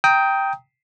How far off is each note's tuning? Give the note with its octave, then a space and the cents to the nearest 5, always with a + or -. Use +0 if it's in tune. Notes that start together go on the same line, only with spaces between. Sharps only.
G5 +0 A#5 -10 D#6 +25